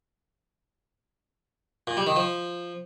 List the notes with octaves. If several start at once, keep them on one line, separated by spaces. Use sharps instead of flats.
A#2
G3
D#3
F3